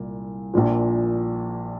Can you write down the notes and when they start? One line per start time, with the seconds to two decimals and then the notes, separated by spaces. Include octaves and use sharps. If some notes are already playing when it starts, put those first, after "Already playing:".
Already playing: C2 A#2
0.54 A#1 A#2 F3